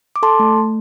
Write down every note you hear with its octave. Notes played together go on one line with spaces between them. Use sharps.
D6
A4 A5 C6
A3
A3